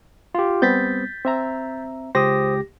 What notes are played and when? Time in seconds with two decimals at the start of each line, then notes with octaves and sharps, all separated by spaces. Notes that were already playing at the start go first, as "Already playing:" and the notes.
0.35 F4 G4
0.62 G3 B3 C4 G6 A6 B6
1.25 C4 E5 A#5
2.15 C#2 G4 C5 D#6 A#6